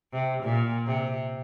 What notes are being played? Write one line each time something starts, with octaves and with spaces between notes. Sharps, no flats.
C3
A#2
C3